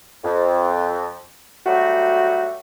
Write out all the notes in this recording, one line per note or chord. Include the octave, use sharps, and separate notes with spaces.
F2
F#3 G3 A3 F#4